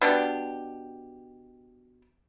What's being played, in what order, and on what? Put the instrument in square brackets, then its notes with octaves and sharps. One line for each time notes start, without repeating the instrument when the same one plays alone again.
[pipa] B2 D4 G4